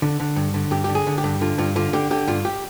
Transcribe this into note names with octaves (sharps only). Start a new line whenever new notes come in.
D3
D3
G2
D3
G2 G4
D3 G4
G#4
D3
G4
G2
D3 F4
G2 F4
D3 F4
D3 G4
D3 G4
G2 F4
G4